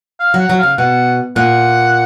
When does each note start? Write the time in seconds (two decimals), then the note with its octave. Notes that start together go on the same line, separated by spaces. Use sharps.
0.20 F5
0.34 F#3
0.39 F#5
0.50 F#3
0.59 C#3 F5
0.78 B2 F#5
1.36 A#2 F#5